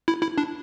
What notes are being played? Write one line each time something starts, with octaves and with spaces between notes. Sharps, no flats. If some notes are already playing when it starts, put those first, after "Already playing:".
E4
E4
D4